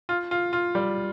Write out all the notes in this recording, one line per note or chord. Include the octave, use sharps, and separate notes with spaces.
F4
F4
F4
G3